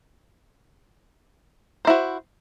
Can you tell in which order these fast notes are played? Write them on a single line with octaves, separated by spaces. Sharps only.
C5 E4 F#4